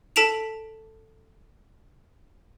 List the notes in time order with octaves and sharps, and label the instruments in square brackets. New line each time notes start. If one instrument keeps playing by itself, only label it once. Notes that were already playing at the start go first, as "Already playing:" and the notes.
[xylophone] A4 A5 B6 D7 E7 F7